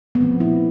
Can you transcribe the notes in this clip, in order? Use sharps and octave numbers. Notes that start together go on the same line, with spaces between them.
B3
A#2 F3 A3 C4
E4